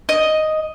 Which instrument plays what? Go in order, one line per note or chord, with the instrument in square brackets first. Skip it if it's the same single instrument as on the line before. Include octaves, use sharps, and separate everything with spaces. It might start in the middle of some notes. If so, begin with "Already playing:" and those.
[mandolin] D#5